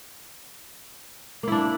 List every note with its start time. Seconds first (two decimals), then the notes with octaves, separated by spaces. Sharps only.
1.43 A#3
1.48 E4
1.52 D4